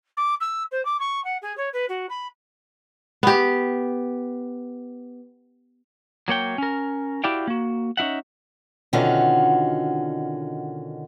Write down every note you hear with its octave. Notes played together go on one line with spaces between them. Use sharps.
D6
E6
C5
D6
C#6
F#5
G#4
C#5
B4
F#4
B5
B3 G4
F#3 A#3 C#5 G5
C#4 A#4
E4 F#4 G4 D5 F5 G5
A#3 F#4
C#4 D#4 E4 E5 F#5
B2 D3 D#3 C#4 F4 F#4